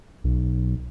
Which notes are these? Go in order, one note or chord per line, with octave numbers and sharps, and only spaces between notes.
B1